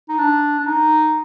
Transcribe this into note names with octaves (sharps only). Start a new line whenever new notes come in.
D#4
D4
D4
D#4